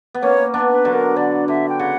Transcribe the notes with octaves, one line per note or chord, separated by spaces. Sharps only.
B3
A#3 C#4 C#5
B3 D4
B4
D3 F#3
A#4
D3 D5
D3 E5
G5
C#3 F#5